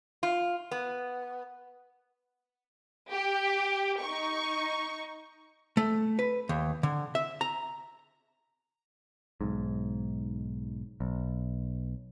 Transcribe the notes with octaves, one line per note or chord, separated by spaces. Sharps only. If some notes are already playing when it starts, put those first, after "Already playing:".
F4
B3
G4
D#4 C#6
A3
B4
D#2
D3
E5
A#5
B1 G#2
B1